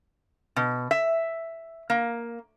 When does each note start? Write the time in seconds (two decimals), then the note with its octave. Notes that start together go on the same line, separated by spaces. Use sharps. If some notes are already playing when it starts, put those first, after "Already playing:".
0.56 B2
0.91 E5
1.90 A#3